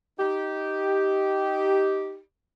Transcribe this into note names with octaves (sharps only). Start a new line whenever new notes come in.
D#4 G4